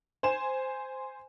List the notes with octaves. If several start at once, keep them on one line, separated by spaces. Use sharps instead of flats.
C5 G#5 E7